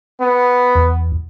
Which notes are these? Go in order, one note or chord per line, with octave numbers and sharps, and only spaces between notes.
B3
E2